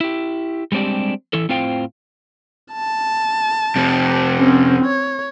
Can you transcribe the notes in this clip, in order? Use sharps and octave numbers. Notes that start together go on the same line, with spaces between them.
E4 G4
G3 G#3 C4 D4 G4
E3 E4 A4
A2 C4 F4 C5 F5 G5
A5
F2 C3
C4 C#4
C#5